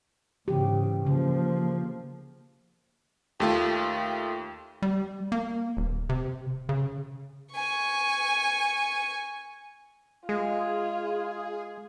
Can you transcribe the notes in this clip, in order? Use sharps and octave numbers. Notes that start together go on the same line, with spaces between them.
G#2 C#3 E3 G4
C#3 F3 A#3
D#2 A3 F4 G4
G3
A#3
D#1
C3
C#3
G#5 C#6
G#3 F4 G#4